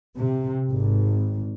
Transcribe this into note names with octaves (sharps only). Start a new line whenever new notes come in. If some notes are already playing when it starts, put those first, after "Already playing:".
C3
G#1